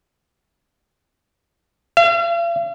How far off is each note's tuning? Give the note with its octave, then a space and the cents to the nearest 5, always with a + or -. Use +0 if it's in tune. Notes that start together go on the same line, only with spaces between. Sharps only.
F5 -45